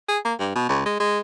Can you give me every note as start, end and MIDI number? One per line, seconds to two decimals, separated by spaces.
0.09 0.19 68
0.25 0.34 58
0.40 0.53 43
0.56 0.68 47
0.69 0.82 37
0.86 0.95 56
1.00 1.19 56